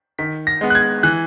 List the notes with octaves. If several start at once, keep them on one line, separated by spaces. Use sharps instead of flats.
D#3 B6
A#6
G#3 B3
F#6
G#6
E3 F#6